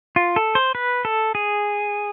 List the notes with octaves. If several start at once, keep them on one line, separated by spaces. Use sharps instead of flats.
F4
A4
C5
B4
A4
G#4